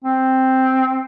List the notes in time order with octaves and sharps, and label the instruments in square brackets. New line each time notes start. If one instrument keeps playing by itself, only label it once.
[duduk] C4